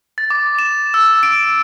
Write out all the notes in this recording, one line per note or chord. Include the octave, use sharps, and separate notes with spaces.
A6
D6
E7
E6
D7